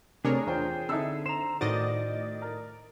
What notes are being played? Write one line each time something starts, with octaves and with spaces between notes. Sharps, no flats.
C3 A3 C4 D4 G#4 A#4 C#5
E2 F4 C5 G5
D3 C4 D#4 E4 A4 E6
C5 A#5 E7
A2 D#3 F#4 C5 D5 D#5 D6 A6
A#4